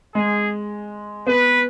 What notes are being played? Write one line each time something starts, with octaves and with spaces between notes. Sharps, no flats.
G#3 G#4
B3 B4